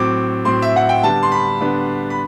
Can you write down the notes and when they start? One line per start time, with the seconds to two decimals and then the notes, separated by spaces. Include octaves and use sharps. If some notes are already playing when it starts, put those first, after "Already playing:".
Already playing: A2 F#3 C4 D6
0.45 A2 F#3 C4 C6
0.62 E5
0.76 F#5
0.89 G5
1.03 D3 G3 B3 D4 A5
1.23 C6
1.32 B5
1.61 D3 G3 B3 D4
2.10 B5